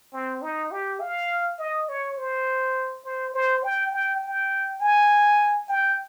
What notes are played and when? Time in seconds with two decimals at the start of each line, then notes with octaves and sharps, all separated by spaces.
0.13 C4
0.42 D#4
0.71 G4
1.01 F5
1.59 D#5
1.88 C#5
2.17 C5
3.05 C5
3.34 C5
3.64 G5
3.92 G5
4.23 G5
4.81 G#5
5.69 G5